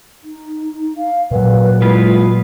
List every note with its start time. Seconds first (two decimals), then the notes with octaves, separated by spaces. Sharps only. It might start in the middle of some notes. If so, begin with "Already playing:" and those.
0.24 D#4
0.97 F5
1.31 A#2 F#3 B4
1.82 G#3 E4 F4 B4